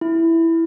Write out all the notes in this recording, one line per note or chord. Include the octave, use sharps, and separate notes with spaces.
E4